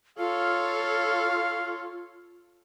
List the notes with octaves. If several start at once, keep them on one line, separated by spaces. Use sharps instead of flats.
F4 A4 C#5 F5